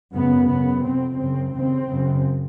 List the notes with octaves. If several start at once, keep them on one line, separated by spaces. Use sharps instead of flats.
F#2 C#3 B3
F#2 C#3 B3
F2 C3 C4
F#2 C#3 C4
D#2 C#3 C4
F#2 C#3